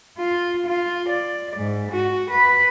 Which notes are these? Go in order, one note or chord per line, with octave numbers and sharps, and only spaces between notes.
F4
F4
D5
G#2
F#4
B4